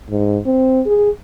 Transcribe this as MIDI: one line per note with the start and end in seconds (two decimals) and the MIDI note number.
0.10 0.38 44
0.45 0.81 60
0.86 1.10 68